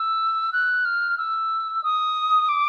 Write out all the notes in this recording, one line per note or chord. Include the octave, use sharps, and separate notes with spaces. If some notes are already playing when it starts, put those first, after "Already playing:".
Already playing: E6
F#6
F6
E6
D#6
D6